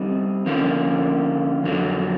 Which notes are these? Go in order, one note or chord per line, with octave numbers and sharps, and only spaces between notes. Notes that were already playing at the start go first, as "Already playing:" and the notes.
Already playing: G3 C4 D#4
D3 F3 A#3 C#4
F2 D3 F#3